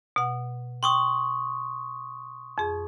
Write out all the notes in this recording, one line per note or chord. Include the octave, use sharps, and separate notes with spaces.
B2 F#5
G5 C6 C#6 D#6
F2 G#4